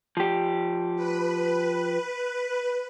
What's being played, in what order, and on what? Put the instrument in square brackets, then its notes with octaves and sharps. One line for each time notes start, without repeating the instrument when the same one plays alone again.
[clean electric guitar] F3 G4
[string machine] B4